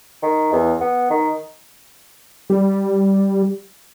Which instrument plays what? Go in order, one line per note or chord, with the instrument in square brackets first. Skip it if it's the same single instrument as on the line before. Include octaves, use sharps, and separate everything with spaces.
[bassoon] D#3
E2
B3
D#3
[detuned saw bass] G3